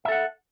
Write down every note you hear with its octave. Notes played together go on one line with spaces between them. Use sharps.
A4 E5 F#5